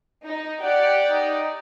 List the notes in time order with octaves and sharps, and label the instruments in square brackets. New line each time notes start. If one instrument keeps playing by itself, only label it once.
[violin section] D#4
[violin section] G4 D5 [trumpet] F#5
[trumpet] D#4